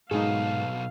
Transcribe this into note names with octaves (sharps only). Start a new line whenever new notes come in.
G#2 B2 F#3 D#4 G#4 A4 F5